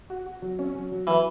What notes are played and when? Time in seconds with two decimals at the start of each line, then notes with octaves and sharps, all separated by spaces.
0.10 F#4
0.26 F#4
0.42 F#3
0.59 C#4
0.75 F#3
0.92 F#3
1.07 E3 F#3